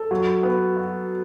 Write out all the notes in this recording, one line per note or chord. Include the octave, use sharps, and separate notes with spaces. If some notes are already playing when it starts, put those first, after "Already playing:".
Already playing: A4
F#3
B3
F#4